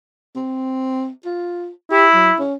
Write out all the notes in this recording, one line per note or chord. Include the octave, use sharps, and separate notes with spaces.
C4
F4
E4 G4
F#3
C#4